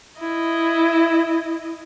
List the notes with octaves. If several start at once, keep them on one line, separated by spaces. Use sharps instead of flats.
E4 D#5